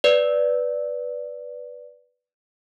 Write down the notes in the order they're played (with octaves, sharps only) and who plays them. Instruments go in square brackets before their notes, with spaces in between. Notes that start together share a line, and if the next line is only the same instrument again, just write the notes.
[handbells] B4 D5